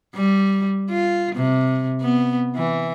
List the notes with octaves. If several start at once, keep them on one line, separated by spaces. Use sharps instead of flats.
G3
F4
C3
B3
E3